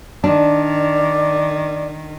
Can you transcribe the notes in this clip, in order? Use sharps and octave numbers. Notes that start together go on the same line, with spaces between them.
D#3 D4 D5